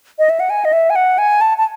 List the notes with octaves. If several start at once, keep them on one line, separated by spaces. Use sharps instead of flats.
D#5
E5
F#5
G#5
D#5
E5
G#5
F#5
G#5
A5
A5